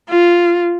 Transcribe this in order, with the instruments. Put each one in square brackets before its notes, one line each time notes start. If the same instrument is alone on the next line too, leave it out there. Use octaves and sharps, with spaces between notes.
[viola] F4